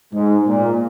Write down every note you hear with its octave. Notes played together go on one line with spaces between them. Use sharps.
G#2
A#2